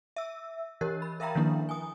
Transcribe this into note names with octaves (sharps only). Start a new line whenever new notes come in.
E5 E6
E3 G4 A#4 C#5
B5
A#4 E5 F5 G5 A#5 B5
D#3 F3 A#3 D4 E4
G#5 D#6